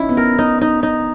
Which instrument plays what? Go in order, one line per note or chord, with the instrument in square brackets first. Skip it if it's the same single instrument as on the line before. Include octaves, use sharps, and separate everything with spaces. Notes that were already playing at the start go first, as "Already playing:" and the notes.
Already playing: [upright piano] C#4 D#4 [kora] E4
[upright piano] B3
[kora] A#4
D#4
D#4
D#4